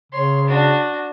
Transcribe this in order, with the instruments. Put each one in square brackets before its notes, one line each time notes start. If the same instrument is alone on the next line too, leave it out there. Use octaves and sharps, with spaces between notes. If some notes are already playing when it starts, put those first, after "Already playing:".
[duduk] C#3 [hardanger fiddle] C#5 C6
[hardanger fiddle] D4 F#4